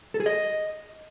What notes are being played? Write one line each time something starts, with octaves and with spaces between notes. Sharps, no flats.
A4
G#4
D#5